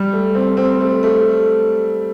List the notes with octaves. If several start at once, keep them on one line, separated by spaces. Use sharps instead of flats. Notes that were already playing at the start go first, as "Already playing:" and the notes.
Already playing: G3
A3
C4
C4
A3
A3